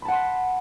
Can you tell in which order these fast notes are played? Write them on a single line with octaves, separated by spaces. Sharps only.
B5 A5 F#5 C6 B6